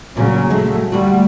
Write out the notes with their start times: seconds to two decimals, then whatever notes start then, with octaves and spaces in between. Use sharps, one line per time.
0.17 A#2 C#3 F#3 C#4
0.50 F#3 G#3 A3
0.92 D2 G3 F#4